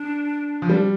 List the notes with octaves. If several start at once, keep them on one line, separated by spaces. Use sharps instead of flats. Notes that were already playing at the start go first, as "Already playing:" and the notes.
Already playing: D4
F3
G3